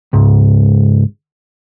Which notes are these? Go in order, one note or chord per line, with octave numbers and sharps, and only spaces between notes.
C#2 G#2